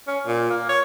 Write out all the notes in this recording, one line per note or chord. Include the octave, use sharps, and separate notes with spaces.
C#4
A#2
A#3
C#5